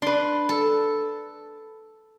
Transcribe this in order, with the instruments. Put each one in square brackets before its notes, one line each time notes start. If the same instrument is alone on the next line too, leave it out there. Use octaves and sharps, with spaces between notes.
[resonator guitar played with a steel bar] D4 B4 [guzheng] C6
[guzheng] A4